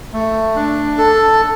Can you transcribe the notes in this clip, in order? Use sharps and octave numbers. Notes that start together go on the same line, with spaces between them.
A3
D4
A4